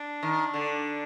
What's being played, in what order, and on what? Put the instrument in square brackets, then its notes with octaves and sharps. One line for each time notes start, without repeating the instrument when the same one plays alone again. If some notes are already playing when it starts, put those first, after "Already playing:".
Already playing: [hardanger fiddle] D4
[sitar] D#3
D3